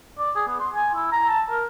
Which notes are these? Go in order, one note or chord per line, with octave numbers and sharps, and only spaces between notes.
D5
G#4
B3
C6
G#5
E4
A#5
A5
A#4